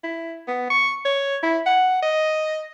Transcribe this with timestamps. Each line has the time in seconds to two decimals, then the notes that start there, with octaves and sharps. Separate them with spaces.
0.04 E4
0.48 B3
0.70 C#6
1.05 C#5
1.43 E4
1.66 F#5
2.03 D#5